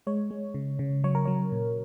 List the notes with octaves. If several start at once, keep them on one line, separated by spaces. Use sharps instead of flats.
G#3 C#5
G#3
C#3
C#3
F#3 C#5
A#4
F#3 C#5
A#2